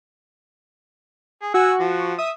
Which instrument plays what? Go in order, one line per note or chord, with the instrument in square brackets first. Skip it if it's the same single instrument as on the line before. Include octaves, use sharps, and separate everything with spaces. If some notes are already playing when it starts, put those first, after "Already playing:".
[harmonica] G#4
[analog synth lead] F#4 [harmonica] F#5 G#5 E6
[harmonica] F3
[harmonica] E5 [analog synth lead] D#6